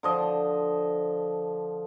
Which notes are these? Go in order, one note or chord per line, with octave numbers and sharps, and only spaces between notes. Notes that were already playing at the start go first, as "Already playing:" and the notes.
D3 F3 D#5